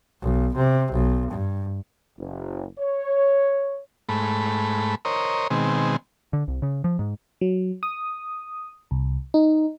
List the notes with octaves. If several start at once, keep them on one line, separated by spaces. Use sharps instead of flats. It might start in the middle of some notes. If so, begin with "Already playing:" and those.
B1
C3
B1
G2
F#1
C#5
G#2 A3 B5
A#4 C5 C#5 D#5
B2 D#3 G#3 C4
D3
C2
C#3
F3
G#2
F#3
D#6
C2
D#4